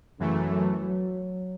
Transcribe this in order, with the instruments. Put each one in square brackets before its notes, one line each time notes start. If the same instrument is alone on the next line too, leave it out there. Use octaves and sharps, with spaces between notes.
[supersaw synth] F#2 E3 A3 [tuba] C#3
[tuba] F#3
F#3